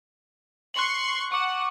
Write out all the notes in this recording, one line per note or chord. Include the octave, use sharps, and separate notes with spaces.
C6 C#6 F#6 F#7
F#5 C#6 D6